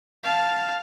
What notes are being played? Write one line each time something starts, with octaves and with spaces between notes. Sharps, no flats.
F5 A5